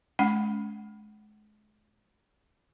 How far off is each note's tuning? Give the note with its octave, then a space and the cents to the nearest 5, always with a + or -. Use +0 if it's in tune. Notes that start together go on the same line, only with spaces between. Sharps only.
G#3 +35 C#4 +25 F#5 +30